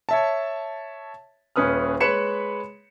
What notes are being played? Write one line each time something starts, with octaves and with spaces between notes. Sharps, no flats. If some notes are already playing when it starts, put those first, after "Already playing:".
C#5 E5 A5
D#1 C#4 B4 D#6 F6
G#3 B4 C#5 B5 C#7 E7